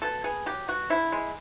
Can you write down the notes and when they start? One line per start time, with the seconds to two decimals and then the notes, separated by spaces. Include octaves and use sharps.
0.02 B2 A4
0.24 B3 G#4
0.46 F#3 G4
0.68 B2 F#4
0.90 D3 E4
1.12 G#3